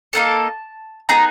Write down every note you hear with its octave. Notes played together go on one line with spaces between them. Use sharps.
A#3 D#4 F#4 A4 A5
B3 D#4 G#4 A#5